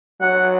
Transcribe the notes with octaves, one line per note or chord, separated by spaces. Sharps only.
F#3 F#5